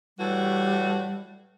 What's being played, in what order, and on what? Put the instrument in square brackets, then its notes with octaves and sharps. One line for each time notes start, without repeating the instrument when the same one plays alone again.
[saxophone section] A2 E3 F#4 [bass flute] G3